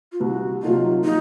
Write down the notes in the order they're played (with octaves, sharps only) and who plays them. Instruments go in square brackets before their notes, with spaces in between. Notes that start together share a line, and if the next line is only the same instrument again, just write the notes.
[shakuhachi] F4
[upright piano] C2 [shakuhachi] F#4
[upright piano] C3 F#3 A#3 D#4 [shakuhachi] F4
[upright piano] F3 [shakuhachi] D#4